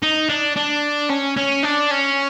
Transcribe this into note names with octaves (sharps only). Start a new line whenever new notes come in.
D#4
D4
D4
C#4
C#4
D4
C#4